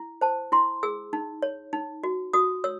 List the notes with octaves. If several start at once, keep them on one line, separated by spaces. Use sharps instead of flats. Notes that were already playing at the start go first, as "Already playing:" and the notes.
Already playing: E4
C5 A5
E4 C6
G#4 E6
D#4
C#5
D#4
F#4
F#4 D#6
C#5 E6